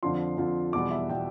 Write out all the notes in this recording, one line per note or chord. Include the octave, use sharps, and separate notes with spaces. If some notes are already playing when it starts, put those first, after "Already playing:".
F2 D3 F3 C6
F2 D3 F3
E2 B2 G3 D6
E5
B2 G3 G5